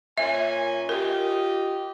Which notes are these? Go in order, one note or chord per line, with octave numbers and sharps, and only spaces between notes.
A#2 C#4 E5 G#5
F4 G4 A#4 D#5